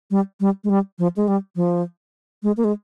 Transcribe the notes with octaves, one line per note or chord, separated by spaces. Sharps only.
G3
G3
G#3
G3
F3
G#3
G3
F3
G#3
A#3
G#3